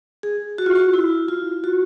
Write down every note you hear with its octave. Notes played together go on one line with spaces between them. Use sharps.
G#4
F#4
F4
F#4
E4
F4
F#4